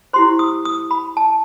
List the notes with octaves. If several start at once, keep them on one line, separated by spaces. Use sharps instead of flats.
E4 G4 C5 C6
D#6
D#6
B5
A5